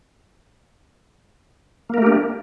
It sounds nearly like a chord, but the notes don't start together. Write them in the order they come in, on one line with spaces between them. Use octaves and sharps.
A#3 A#4 A3 G4 D4